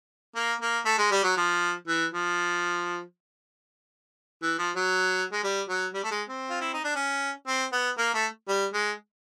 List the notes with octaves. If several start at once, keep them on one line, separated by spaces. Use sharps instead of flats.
A#3
A#3
A3
G#3
G3
F#3
F3
E3
F3
E3
F3
F#3
G#3
G3
F#3
G3
A3
G#3
C4
F4
E4
D#4
D4
C#4
C4
B3
A#3
A3
G3
G#3